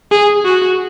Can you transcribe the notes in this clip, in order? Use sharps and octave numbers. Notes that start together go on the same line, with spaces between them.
G#4
F#4